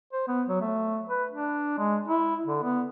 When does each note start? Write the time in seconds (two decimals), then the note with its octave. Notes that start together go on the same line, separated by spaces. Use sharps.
0.13 C5
0.27 B3
0.48 F#3
0.61 A3
1.09 B4
1.31 D4
1.78 G#3
2.08 E4
2.46 D3
2.63 B3